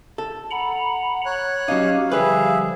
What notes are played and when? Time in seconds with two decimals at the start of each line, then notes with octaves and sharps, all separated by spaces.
0.18 A4
0.51 F#5 A#5 B5
1.26 C#5 F#6
1.68 F#3 C#4 D#4 G4 F5
2.12 D3 F3 G3 G#4 B4 E5